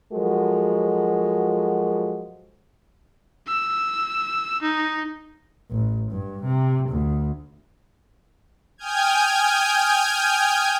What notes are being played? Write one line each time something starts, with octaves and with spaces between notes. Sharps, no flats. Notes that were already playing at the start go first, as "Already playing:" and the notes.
F3 F#3 G#3 F#4 A4 A#4
E6
D#4
A1
G2
C3
D2
G5 G#5 D#6 F6 G6 G#6